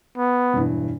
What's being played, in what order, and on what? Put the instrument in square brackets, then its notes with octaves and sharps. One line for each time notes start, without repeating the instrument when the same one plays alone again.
[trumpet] B3
[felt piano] E1 G2 E3